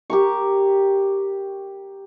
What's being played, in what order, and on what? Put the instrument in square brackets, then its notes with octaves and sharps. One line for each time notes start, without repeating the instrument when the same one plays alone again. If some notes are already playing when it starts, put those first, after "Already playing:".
[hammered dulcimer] G4 A#4 C#6